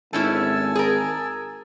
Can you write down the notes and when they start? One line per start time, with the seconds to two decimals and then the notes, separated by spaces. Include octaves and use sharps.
0.13 G#1 A3 C#4 E4 G#5 A5 E6
0.75 G#4 A#4